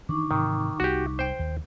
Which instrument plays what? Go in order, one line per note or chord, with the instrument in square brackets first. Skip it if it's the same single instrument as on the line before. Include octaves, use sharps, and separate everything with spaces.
[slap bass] D#3 E3 D4 [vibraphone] D#4 C#6 D6
[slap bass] G#2 C3 E3 [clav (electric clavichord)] D#3
[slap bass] C2 G3 [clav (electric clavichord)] F#4 G4
[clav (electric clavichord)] C5 G5
[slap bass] D#2